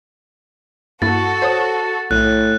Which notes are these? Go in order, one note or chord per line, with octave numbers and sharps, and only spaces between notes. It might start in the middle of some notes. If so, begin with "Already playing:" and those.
G2 A#3 E4 F#4 A4 A6
C5 C#5 D#6
B1 A2 F#6